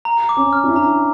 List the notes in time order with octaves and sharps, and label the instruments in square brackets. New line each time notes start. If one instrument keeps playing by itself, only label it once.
[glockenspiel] A#5
D6
[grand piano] C#4
[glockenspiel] F6
[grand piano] D4
E4
[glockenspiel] A#5